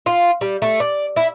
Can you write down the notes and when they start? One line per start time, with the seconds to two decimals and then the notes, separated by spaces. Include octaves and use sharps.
0.06 F4
0.41 G3
0.62 A3
0.80 D5
1.16 E4